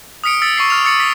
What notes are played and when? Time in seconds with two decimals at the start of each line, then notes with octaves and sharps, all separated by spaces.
0.24 D#6 F6 B6 C#7 D7
0.42 E6 A6 B6 C#7
0.57 C#6 D6 C7
0.70 F6 F7
0.85 E6 A6 C#7 G7
1.00 B6